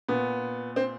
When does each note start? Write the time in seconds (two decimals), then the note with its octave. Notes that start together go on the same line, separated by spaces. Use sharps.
0.08 A#2 B3
0.76 C4